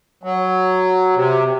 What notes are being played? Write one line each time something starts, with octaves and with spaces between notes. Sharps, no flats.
F#3
C3